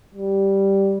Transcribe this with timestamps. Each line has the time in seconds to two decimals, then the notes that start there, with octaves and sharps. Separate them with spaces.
0.15 G3